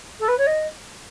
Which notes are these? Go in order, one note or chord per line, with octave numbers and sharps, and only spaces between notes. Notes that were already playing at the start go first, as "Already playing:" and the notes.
A4
B4
C#5
D#5